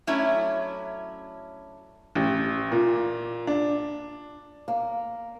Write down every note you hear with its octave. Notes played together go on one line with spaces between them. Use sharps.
F#3 A3 C#4 D4 E4
A1
A#2
D4
A#3